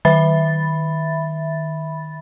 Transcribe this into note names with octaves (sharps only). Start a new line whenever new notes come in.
D#3 E5 B5 A6